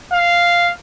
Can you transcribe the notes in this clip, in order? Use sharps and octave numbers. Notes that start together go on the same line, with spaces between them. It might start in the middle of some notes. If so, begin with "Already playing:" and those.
F5